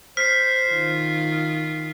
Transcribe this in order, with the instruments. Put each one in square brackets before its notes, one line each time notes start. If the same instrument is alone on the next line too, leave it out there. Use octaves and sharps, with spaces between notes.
[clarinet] C5 [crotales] F6 C7 [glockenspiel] B6
[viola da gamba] D#3 F4